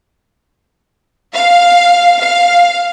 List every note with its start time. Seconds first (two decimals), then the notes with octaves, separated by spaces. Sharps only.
1.32 F5
2.16 F5